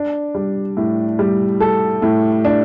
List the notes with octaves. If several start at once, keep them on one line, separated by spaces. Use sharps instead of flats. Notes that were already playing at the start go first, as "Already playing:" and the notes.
Already playing: D4
G3
A2
G3
A4
A2
D4